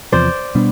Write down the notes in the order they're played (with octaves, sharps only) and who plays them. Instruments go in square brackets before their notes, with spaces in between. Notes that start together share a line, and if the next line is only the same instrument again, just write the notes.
[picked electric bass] E2 C3 F3 [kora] C5 D5
[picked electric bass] B2 G3 B3 D4